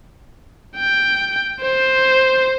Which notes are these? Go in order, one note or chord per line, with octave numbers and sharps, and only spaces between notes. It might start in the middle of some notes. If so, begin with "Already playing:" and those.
G5
C5